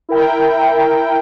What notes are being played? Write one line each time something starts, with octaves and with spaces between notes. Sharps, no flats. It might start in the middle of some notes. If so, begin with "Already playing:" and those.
E4 A#4 G5